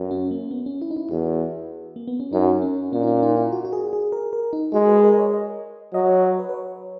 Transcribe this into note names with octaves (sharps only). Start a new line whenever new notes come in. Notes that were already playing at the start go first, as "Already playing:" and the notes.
Already playing: F#2
C#4
A#3
B3
C#4
E4
D#4
E4
E2 F#4
A#3
B3
C#4
F#2 D#4
C#4
A#2 C#4
D#4
C#4
D#4
E4
F#4
F#4
G#4
G#4
A#4
A#4
D#4
G#3 F#4
B4
A#4
D#5
C#5
D#5
F#3 D#5
D#5
C#5
C#5
B4
B4
C#5